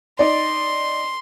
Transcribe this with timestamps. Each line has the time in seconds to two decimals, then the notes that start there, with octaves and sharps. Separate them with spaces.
0.19 D#4 D5 C6